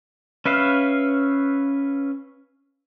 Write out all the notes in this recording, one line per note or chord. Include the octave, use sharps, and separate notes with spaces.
C#4 B4 E5 F5